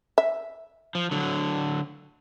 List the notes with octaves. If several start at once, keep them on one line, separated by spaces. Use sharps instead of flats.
E5
F3
D3 F#3